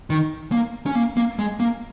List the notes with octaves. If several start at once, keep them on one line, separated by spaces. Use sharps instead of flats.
D#3
A#3
C#4
A#3
A#3
G#3
A#3